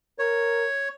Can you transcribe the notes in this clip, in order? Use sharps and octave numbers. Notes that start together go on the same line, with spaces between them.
A#4 C#5